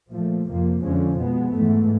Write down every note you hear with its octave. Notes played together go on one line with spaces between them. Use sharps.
A#2 F3 A3
F2 C3 F3 A#3
F2 D3 F3 G#3 C#4
B2 G#3 B3
G#2 E3 A3